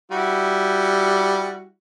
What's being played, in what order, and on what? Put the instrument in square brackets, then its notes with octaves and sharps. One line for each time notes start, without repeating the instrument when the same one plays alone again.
[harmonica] G3 E4 F#4